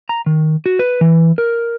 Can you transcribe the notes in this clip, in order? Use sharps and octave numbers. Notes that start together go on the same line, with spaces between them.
A#5
D#3
F#4
B4
E3
A#4